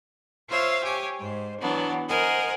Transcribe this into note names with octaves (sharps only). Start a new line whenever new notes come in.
F4 C5 C#5 E5 F5
G4 C#5 G#5
G#2 C5
E3 F#3 B3 D4
A#4 C5 D#5 F#5 G#5